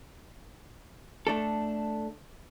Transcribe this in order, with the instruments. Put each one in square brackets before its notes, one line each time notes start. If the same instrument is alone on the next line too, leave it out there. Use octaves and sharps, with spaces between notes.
[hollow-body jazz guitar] A3 D4 A4